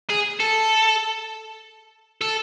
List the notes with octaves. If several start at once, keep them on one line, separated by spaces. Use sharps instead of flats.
G#4
A4
A4